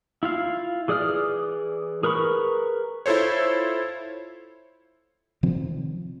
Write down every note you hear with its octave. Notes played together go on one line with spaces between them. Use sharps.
E4 F4 F5
E3 G#4 D5 D#6 F6
G#4 A#4 B4 B5 C#6
E4 F4 A4 C5 C#5
C3 D#3 F3 C4